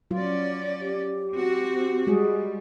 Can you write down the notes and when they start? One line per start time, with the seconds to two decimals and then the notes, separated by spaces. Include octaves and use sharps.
0.11 F#3 C#4 F4 D5
0.81 G4
1.32 C4 F#4
2.07 G3 G#3 F#4 G#4